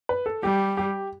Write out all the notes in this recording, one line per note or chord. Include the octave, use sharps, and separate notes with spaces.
B4
A4
G3 G4
G4